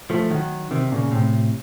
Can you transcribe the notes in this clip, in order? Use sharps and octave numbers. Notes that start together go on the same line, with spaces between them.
F3 A3
D#3 F#3
C3 D#3
A#2 C#3
A2 C3